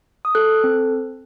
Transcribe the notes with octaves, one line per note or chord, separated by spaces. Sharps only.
D#6
A4 F#6
C4